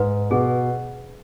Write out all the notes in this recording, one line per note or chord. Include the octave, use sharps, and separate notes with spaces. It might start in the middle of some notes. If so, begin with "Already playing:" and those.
Already playing: G#2 B4
B2 G#4